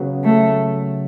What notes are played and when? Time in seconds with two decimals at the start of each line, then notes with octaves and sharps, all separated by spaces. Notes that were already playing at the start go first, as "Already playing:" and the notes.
Already playing: C#3 F#3 B3
0.24 A3